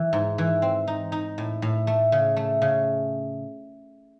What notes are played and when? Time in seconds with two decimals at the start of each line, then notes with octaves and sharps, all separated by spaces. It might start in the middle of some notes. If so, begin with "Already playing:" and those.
Already playing: E3
0.13 G#2
0.38 E3
0.62 C4
0.87 D#4
1.12 D#4
1.38 A2
1.62 A2
1.87 A3
2.12 C#3
2.37 A3
2.62 C#3